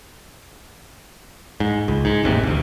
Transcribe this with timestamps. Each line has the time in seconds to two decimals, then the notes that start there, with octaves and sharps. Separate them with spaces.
1.60 G#2
1.88 C#2
2.05 G#2
2.23 E1 A1 D#2 C3
2.43 E1 D2